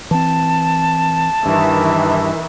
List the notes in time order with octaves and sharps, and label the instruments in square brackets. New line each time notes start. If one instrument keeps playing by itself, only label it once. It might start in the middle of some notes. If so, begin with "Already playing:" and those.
[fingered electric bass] E3 C4 [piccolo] A5
[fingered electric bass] G2 [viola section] D#3 E3 E5